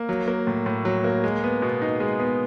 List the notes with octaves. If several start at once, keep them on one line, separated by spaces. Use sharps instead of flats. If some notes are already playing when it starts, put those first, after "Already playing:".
Already playing: A#3
F#3
A#3
A2
A2
F#3
A#3
G#3
B3
B2
D#4
G#3
B3